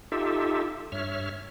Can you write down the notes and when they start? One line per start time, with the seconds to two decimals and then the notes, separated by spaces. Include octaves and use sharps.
0.12 D#4 F4 G4 A4 E5
0.92 G2 C#5 E5 F6